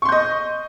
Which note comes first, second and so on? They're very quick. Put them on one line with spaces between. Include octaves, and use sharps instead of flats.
C#6 C6 G6 D#5